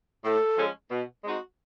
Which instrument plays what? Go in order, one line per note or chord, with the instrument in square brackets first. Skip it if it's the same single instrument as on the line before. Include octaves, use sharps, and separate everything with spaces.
[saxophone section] A2 [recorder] A4
[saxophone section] F3 G#3 C#4
B2
G#3 C4 D#4 F#4